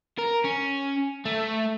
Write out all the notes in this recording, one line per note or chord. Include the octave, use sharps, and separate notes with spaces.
A#4
C#4
A3